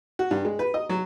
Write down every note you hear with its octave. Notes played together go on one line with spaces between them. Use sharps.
F#4
G2
G#3
B4
D#5
F#3